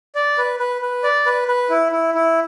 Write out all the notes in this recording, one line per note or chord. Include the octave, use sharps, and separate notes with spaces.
D5
B4
B4
B4
D5
B4
B4
E4
E4
E4